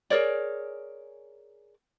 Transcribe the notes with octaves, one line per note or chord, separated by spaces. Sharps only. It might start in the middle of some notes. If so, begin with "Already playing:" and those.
G#4 A#4 C#5 D5